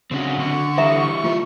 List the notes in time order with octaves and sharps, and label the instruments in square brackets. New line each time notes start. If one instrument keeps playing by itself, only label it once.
[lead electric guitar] C#3 [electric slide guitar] C4 D4 F#4
[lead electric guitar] D3 [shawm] C#6
[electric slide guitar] E3 G3 [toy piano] A4 E5 A#5
[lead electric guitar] A3 E5 [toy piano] F4